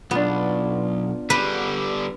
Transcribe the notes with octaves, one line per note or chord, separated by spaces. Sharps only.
B1 B3 D4 F4
D3 G3 B4